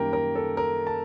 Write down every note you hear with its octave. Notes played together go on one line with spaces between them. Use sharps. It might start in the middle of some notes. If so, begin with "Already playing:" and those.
Already playing: F#2 D#3 G3 A#3 A#4 G5
A#4
A4
A#4
A5